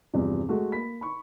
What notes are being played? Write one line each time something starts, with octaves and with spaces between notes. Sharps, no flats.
E2 G2 C3 F3
G#3 A3 F#4
A#3 B5 B6
B5 C#6